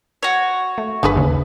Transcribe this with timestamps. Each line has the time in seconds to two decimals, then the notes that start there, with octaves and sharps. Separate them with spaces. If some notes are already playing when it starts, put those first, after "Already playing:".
0.23 F#4 C#5
0.78 A3
1.03 G1 D4 G#4 B4
1.16 D#2 C#3